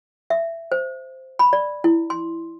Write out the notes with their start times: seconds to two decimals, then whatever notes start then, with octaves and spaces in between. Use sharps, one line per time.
0.30 E5
0.72 C5
1.39 B5
1.53 D5
1.84 E4
2.10 C6